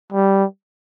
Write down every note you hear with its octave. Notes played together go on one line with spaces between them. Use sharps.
G3